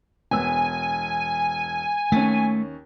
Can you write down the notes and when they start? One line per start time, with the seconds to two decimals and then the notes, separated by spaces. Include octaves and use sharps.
0.31 E1 B3 G#5 E6
2.12 D#2 A3 C#4